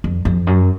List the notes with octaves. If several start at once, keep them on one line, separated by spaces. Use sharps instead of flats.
F2
F2
F#2